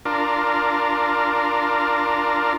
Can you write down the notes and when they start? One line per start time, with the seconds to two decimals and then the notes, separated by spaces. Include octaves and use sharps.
0.05 D4 F4 A#4